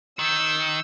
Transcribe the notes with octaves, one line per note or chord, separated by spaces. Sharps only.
D#3 E6 G6